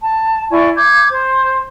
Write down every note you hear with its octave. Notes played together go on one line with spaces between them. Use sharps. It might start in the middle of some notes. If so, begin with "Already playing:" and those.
A5
E4 D5 G#5 C#6
D6 G6 G#6
C5